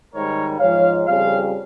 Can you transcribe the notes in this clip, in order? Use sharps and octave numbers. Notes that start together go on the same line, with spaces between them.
G#2 D#3 G3 A#4 C#5
G#2 F3 C#5 F5
F2 C#3 G3 C#5 F5